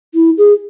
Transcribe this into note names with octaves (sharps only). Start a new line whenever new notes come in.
E4
G#4